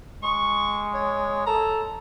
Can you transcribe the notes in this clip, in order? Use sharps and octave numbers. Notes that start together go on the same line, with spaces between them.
G#3 C#6
C#5
A4 A#5